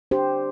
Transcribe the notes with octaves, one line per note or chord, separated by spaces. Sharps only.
D4 G4 C5